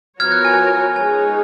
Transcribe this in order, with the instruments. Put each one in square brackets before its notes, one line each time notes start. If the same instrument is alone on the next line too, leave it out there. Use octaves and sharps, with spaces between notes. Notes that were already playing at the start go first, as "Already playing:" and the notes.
[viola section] F3 B3 F#4 A#4 C#5 [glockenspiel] F6 G#6
[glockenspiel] F#6
G#5
[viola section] G#3 D#4 G#4 C#5 [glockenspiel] G#5